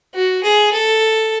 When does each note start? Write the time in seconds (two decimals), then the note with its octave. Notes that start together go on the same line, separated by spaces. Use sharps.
0.14 F#4
0.43 G#4
0.72 A4